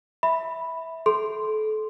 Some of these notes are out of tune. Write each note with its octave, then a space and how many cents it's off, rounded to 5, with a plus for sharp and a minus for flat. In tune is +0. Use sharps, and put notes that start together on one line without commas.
E5 -15 B5 +0
A4 -30 C6 +0